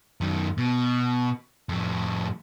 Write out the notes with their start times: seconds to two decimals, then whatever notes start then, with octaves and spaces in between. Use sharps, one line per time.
0.21 F#2 D#3
0.58 B2
1.69 F2 A2